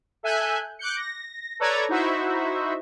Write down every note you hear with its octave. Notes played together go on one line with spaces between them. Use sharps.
A4 E5 G#5 F#6 G6
D6 F#6 G6 C#7
A#6
A4 B4 C#5 D5 A#5 G#6
D#4 E4 F#4 C5 E5